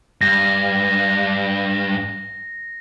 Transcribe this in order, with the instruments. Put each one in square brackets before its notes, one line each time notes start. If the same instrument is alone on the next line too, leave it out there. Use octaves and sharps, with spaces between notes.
[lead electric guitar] G2 [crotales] A#6